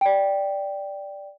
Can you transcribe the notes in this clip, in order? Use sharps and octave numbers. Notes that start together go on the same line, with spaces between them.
D5 G5